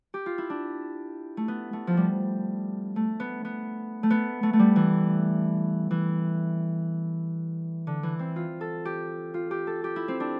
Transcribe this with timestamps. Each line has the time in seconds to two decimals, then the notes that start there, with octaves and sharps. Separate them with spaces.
0.14 G4
0.26 F4
0.38 E4
0.50 D4
1.37 A3
1.48 B3
1.73 A3
1.87 F3
1.97 G3
2.96 A3
3.20 B3
3.45 B3
4.03 A3
4.10 B3
4.43 A3
4.53 A3
4.59 G3
4.76 E3
5.91 E3
7.87 D3
8.03 E3
8.19 C4
8.36 F4
8.61 A4
8.85 G4
9.34 F4
9.51 G4
9.67 A4
9.84 G4
9.96 E4
10.08 C4
10.20 D4